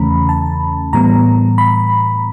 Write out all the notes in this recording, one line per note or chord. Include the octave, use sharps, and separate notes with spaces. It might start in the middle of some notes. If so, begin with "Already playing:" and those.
Already playing: E2 C#3 E3 A3 C#4 A#5 B5
A5
A2 E3 G3 B3 A#5
B5